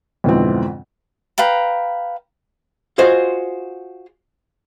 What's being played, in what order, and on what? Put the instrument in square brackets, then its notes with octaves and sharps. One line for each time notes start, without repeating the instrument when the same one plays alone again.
[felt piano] F2 G#2 B2 D3 E3 C4
[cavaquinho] B4 F5 G5 A#5
[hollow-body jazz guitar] F4 F#4 G#4 C5 D#5